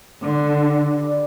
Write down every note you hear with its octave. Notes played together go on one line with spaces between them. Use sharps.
D3 D4
G4 D5
G3